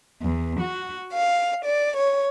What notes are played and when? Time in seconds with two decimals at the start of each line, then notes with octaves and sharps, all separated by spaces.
0.24 E2
0.60 F#4
1.13 F5
1.64 D5
1.95 C#5